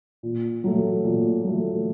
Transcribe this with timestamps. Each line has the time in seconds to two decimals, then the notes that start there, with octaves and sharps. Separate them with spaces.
0.23 A#2
0.64 F#3 A3
1.04 A#2
1.45 F#3 A3